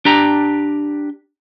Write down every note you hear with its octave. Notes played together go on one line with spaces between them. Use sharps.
D4 G4 A#5